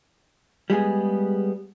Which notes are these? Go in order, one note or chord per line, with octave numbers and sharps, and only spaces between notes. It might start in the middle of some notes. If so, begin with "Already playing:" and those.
G3 G#3 B3 G#4